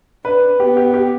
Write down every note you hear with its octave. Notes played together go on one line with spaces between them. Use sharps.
D4 B4
B3 G4
G4
G4